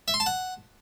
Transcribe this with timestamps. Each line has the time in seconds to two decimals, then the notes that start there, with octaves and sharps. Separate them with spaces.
0.08 E5
0.14 C6
0.20 A5
0.26 F#5